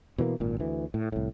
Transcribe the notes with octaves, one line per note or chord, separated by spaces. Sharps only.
B2 E3 F#3 A#3
G#1 A#2
D2 E3
A2
C2 A2